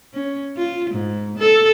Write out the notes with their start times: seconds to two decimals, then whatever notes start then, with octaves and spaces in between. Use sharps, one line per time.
0.14 C#4
0.57 F4
0.90 G#2
1.39 A4